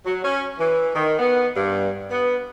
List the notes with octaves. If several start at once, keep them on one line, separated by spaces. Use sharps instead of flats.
F#3
C#4
E3
D#3
B3
G2
B3